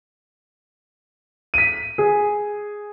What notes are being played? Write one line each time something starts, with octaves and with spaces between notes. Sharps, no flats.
B6 D#7
G#4